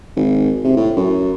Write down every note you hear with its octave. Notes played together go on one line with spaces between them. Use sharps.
G#1
C3
A2
F#2